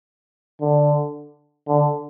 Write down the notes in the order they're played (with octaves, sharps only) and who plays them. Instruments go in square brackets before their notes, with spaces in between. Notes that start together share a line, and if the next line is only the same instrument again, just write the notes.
[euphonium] D3
D3